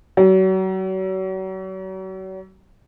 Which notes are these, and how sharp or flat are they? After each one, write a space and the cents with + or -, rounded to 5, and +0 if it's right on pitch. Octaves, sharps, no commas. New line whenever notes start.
F#3 +35